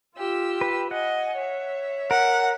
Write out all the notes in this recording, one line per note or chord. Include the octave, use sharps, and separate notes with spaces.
F4 G4 E6
B4
D#5 F#5 G#5
C#5 E5
A#4 F#5